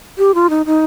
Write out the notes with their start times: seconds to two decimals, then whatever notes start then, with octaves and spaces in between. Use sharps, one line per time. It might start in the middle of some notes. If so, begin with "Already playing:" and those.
0.18 G4
0.35 F4
0.50 D#4
0.66 D#4